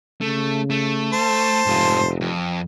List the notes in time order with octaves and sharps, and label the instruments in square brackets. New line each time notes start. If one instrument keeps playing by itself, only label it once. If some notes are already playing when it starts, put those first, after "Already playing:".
[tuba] C#3 [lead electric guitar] A3
[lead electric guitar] A3
[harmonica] C5 A5
[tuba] F1 [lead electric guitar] G#2 F4
[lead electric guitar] F2